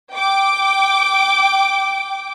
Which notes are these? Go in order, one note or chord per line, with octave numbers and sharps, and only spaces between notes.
G5 D6